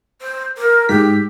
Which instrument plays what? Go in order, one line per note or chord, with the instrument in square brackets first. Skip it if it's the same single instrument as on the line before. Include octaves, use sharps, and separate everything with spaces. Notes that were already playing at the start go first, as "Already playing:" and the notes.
[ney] C5
A#4
[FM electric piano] G#2 B6 [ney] G4